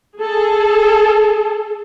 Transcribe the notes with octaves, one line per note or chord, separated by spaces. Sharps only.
G#4 A4